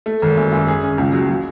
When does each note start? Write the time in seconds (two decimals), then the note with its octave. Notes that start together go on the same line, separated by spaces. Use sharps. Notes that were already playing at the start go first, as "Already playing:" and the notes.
0.06 A3
0.22 G#1
0.37 F#2
0.52 F#2
0.67 G#4
0.83 C#4
0.98 C#2
1.13 F#3
1.29 F#3